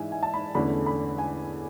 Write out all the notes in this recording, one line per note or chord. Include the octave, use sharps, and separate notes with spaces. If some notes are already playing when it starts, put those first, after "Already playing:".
Already playing: G#2 E3 E5 G#5
G#5
A5
B5
E2 D3 A3 C#4 B5
B5
G#5